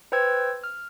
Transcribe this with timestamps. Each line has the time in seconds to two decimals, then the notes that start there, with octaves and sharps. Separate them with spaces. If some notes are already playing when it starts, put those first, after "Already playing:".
0.12 B4 C5 G5 E6 G#6
0.64 F6